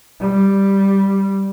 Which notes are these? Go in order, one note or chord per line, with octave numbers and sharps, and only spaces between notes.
G3